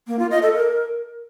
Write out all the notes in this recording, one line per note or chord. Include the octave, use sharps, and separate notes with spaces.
A#3
F4
D#5
A4
A#4